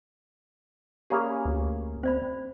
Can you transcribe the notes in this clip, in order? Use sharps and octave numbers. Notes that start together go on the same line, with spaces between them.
A#3 C#4 G4 G#4 D5 B5
D2
C4 C5 D5 B5